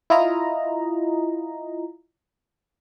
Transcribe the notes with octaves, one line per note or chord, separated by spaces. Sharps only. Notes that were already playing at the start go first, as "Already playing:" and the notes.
E4 F4 D#5 A#5